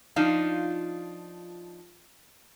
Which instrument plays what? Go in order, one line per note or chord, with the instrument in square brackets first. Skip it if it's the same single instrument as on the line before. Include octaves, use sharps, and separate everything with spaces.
[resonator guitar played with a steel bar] F3 D4 D#4 F4